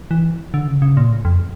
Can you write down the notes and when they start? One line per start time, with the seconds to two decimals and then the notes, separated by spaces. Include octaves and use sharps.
0.11 E3
0.54 D3
0.68 C#3
0.82 C#3
0.97 A#2
1.11 A2
1.25 F2